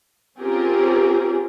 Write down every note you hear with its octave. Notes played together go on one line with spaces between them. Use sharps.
C4 C#4 F4 G4 G#4 A#4